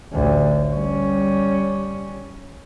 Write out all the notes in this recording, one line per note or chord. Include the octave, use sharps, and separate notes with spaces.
A1 D2
G3 C#4